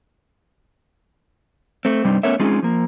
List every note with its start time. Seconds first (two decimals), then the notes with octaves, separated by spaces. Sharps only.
1.85 A3 C4
2.04 G2 C3 G3 C4 D4 D#4
2.23 A3 B3 C#4 A#4 C#5 E5
2.40 G#3 C4 C#4 D#4 F4 G#4
2.62 F3 A#3